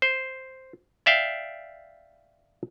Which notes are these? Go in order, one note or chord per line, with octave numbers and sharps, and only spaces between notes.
C5
D5 E5 F5 G5